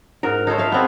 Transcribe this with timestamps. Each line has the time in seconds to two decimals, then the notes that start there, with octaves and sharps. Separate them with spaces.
0.23 G#2 A#4
0.47 D#4 A4 C5 C#5
0.58 E5 F5
0.72 B3 C4 G#4